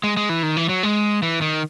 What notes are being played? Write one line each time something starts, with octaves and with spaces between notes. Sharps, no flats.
G#3
G#3
E3
D#3
E3
F#3
G#3
E3
D#3